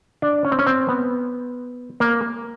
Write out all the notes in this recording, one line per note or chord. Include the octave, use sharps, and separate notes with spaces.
D4
C#4
C4
C#4
C4
B3
A#3